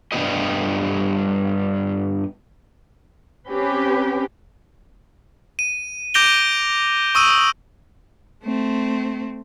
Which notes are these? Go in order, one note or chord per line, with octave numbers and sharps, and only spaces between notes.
G2 G3 B3 D#4 G4 D#5
C4 C#4 G4 B4
D#7
D6 G6 A#6 D7 F7 G7
C#6 D#6 E6 D#7
A3 C4